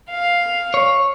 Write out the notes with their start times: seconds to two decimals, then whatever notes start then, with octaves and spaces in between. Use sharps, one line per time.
0.10 F5
0.74 C#5